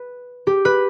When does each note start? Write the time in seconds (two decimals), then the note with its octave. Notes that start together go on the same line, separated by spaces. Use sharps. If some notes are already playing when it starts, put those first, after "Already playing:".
Already playing: B4
0.47 G4
0.65 B4